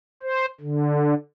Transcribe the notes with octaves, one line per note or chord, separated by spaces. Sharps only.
C5
D3